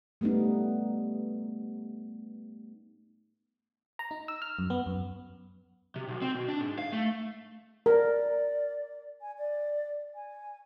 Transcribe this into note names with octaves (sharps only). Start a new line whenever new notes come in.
G3 A3 B3 C#4 D#4
A#5
D#4
E6
F6
F#2
B3
F#2
C3
B1
C4
B2
D4
G#2
F5
A3
A#4 D5
G#5
D5
G#5